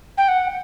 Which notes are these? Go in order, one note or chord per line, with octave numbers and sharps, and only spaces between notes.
G5
F#5